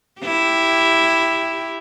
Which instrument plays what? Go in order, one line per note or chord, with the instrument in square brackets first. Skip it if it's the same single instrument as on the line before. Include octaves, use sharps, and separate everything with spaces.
[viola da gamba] E4 G4